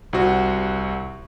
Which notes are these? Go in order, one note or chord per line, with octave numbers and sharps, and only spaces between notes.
C2 C4 F#4